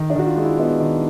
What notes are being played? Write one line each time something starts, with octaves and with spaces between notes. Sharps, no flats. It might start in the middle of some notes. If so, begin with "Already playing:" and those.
Already playing: D#3
D4
D#3 F#4
F4
G#3
E4
B3 D#4
D#3